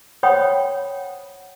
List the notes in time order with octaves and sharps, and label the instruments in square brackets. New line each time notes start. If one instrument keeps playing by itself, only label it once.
[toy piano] C5 C#5 F#5 G5 B5 D#6